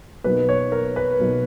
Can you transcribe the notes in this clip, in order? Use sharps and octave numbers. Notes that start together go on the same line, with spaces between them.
B2 F#3 A#3 D#4 B4
C#5
A#4
B4
B2 F#3 A#3 D#4